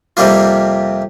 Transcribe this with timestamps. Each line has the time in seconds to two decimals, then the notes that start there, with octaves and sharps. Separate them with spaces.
0.17 F2 C3 G3 A#3 F4